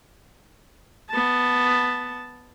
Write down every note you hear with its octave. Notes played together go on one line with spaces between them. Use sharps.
B3 A5